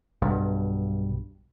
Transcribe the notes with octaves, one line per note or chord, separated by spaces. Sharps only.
B1 G2